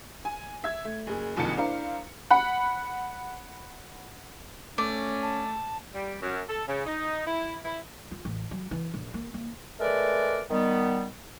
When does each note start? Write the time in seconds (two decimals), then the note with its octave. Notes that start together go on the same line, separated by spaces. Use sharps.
0.25 G#5
0.64 E5 G#6
0.85 A3
1.07 F#1 G#4
1.36 F#1 C2 F2 D#3 A5 C#7
1.57 D4 E4 A#4 C5 F5
2.30 F#5 B5
4.78 A3 C#4 D5
5.22 A5
5.94 G3
6.21 F#2
6.49 A4
6.67 C#3
6.86 D#4
7.26 E4
7.65 E4
8.11 F4
8.25 A1
8.51 F#3
8.71 E3
8.94 A#1
9.14 A#3
9.34 A#3
9.80 G#3 A3 A#4 B4 D5
10.51 D#3 G3 B3